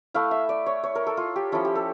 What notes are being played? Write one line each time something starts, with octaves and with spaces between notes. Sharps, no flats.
A3 E4 F5
E5
D5
C#5
C#5
A#4
A4
F4
G4
F3 C#4 E4 A4
G4
A4